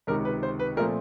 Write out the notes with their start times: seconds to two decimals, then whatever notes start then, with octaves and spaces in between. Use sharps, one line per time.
0.07 C#2 C3 D#3 A#4
0.25 B4
0.43 C5
0.59 B4
0.77 A#2 F3 A3 C4 A#4